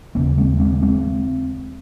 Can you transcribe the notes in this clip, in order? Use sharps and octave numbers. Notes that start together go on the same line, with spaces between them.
D#2 C#3 A#3 C#4
G#3 C4
G#3 C4
G#3 C4